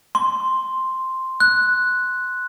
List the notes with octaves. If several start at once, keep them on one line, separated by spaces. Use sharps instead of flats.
C6
F#6